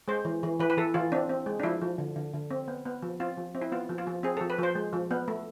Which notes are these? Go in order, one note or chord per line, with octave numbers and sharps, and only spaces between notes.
G#3 C5
E3
E3
E3 B4
B4
E3 A4
E3 F4
C4 D4
C4
G#3
D4
F3 E4
F3
D3
D3
D3
C4
B3
B3
F3
C4 F4
F3
C4
E4
B3 F4
F3
F4
F3
C4 G#4
F3 A4
B4
F3 C5
G#3
F3
B3
A3